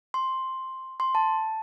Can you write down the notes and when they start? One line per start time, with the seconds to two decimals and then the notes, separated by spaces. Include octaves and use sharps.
0.14 C6
1.00 C6
1.15 A5